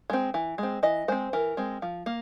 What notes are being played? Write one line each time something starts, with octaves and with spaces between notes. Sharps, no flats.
G#3 C4
E3
G#3 C4
E3 D#5
G#3 C4 C5
E3 A#4
G#3 C4
F3
A#3